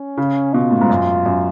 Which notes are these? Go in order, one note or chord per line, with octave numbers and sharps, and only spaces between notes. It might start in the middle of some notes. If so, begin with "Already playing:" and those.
Already playing: C#4
C#3
B2 F4
A2
G#2
F#2
F#2